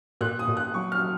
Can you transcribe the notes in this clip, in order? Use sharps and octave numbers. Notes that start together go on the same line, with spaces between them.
A#2 F#6
D#6
A#2
F#6
F#3 C#6
F6
F#3